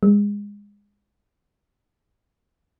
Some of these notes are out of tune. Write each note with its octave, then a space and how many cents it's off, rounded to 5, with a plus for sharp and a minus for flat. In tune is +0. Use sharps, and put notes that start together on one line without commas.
G#3 -25